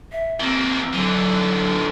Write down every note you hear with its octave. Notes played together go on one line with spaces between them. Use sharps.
E5
E3 A#3 C4
D3 E3 F#3